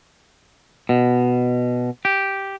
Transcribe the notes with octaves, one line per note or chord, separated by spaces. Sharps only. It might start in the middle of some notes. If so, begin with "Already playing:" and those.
B2
G4